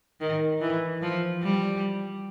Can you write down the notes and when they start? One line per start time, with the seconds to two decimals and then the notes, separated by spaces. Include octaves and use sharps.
0.20 D#3
0.61 E3
1.02 F3
1.43 G3